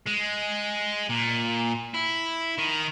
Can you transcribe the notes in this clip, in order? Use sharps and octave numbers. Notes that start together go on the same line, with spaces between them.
G#3
A#2
E4
D#3